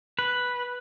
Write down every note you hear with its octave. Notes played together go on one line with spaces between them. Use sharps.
B4